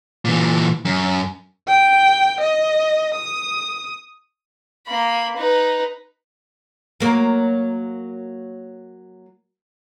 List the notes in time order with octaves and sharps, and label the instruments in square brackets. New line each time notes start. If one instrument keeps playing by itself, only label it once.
[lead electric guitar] A#2 E3
F#2
[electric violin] G5
D#5
D#6
[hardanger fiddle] A#3 B5
D#4 B4
[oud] F#3 A#3